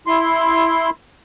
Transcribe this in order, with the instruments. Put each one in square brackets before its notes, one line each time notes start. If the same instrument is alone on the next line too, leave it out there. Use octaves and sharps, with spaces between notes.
[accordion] E4 C6